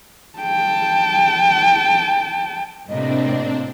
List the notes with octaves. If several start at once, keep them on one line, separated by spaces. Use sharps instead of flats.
G5 A5
A2 C3 A#3 C4 D4 D#5